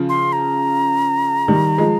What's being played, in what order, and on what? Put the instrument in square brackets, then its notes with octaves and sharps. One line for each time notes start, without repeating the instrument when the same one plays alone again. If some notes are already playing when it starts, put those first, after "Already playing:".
Already playing: [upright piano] C#3 F3
[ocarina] C6
A#5
[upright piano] D#3 G3
F3 G#3